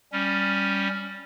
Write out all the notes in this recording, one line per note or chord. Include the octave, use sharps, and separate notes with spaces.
G3 C#4